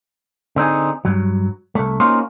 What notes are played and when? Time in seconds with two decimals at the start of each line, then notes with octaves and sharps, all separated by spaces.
0.56 D3 C4 D#4 G#4
1.05 G2 F#3
1.75 C2 A3
2.00 A#3 C#4 D#4 F4 F#4 C5